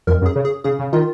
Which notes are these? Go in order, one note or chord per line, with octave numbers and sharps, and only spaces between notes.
F2 A#4
F#2
G#4
C#3
G#4
C#3 G#4
C#3
D#3 F4